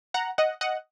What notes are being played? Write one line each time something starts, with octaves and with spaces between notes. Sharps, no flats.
F#5 A#5
D#5 F#5
D#5 F#5